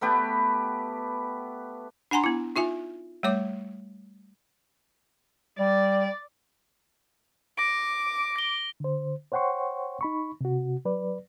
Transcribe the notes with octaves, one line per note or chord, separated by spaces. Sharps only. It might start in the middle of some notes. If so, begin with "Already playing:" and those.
A3 B3 G4 B4
D4 F#5 G#5 A#5 C6
B3 E4
D#4 F4 E5 G#5
G3 A3 C#5 D6
G3 D5
D6 A#6 D7
A#6 G7
D3 C5
C5 C#5 F#5 G5 C6 C#6
D#4 B5 C#6
C3 F#4
F#3 B4 D5